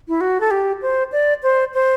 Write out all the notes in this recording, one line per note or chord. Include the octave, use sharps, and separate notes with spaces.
E4
F#4
A4
G4
C5
D5
C5
C5